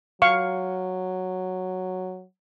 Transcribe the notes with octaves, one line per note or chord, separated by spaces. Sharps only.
F#3 F5 C#6